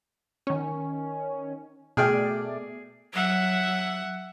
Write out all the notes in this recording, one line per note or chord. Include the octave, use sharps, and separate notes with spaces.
D#3 C#4
B2 A3 G#4 D5 G5 F6
F#3 E5 F#5